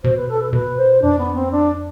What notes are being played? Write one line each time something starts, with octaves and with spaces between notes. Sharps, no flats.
B2 C5
B4
A4
B4
B2 B4
C5
F2 D4
B3
C4
D4